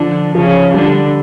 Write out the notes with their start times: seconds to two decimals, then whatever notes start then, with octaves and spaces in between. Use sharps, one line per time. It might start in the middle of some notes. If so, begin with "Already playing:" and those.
Already playing: D3 F3 D4
0.35 C#3 F3 C#4
0.73 D3 G3 D4